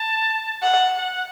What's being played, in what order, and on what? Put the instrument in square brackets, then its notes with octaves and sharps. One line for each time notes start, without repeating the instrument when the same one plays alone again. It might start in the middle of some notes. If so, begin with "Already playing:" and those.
Already playing: [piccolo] A5
[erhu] F#5
[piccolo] F#5